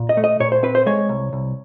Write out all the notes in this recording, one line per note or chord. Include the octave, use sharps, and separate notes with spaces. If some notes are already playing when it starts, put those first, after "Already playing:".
Already playing: A#2
D#5
A3
D#5
A#2 C#5
C5
C4 B4
C5
G#3 C#5
C2
C2